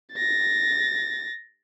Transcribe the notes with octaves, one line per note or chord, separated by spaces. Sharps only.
A6 A#6